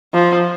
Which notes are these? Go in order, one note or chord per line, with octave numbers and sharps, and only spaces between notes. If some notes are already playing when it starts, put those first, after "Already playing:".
F3